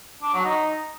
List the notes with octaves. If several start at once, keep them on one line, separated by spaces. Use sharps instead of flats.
D4
F#3
D#4